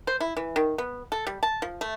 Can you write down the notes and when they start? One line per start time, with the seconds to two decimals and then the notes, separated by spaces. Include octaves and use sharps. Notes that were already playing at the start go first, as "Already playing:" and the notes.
0.07 C5
0.20 E4
0.37 E3
0.56 D#3
0.78 B3
1.12 A4
1.27 G3
1.43 A5
1.62 F3
1.81 A3